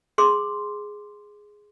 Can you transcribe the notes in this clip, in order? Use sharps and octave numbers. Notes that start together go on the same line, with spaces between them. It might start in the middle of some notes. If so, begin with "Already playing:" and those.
G#4 C6 D6